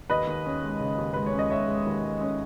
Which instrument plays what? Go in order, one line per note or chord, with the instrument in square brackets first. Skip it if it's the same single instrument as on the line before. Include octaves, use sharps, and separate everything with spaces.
[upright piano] D#2 B4 D#5
D#2
C#4
G#3
C#3
D#2
G#3 B4
C#5
C#4
D#5
G#3 C#5 E5
G#3
D#2
G#3
C#4